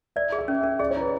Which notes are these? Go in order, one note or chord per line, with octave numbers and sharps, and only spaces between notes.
D5 E5
G#4
E5
C#4
C#4 E5
G#4 D5
C#5
E4 B4